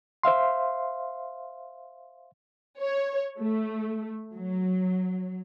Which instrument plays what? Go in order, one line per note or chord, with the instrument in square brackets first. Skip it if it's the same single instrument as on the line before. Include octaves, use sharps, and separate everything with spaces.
[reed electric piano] C5 E5 F5 C6
[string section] C#5
A3
F#3